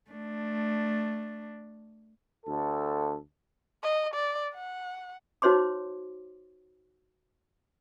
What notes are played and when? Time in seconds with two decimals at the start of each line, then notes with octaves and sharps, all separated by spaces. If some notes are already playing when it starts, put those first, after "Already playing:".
0.10 A3 D4
2.46 D2 A4
3.83 D#5
4.14 D5
4.54 F#5
5.42 D#4 F#4 C5 C#5 C6 D6